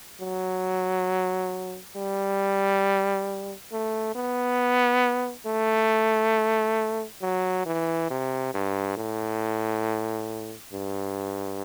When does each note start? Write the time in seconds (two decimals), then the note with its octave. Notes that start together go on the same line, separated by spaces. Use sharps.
0.21 F#3
1.96 G3
3.72 A3
4.15 B3
5.47 A3
7.22 F#3
7.66 E3
8.10 C3
8.54 G2
8.97 A2
10.73 G2